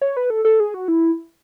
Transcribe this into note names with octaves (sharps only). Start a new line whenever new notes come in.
C#5
B4
A4
A4
G#4
F#4
E4